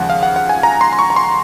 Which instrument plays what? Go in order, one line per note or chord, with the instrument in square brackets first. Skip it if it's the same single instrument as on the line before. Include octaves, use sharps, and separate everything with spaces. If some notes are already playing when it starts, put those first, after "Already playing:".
Already playing: [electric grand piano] D#2 C#3 F3 G#3 F#5
F5
F#5
F#5
G#5
A#5
C6
C6
C#6
A#5
C6